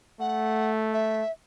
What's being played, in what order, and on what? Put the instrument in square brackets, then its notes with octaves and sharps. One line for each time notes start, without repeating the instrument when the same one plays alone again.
[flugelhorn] A3 [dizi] F#5
[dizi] E5